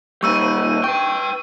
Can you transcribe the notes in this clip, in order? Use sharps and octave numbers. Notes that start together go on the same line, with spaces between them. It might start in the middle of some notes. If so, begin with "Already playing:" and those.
A#2 G3 C#6 E6 D#7
B4 G5 C#6